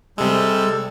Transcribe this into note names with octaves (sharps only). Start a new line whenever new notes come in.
C3 G3 G#3 A4 E6